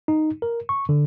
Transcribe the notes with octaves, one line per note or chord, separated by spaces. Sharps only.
D#4
A#4
C#6
D3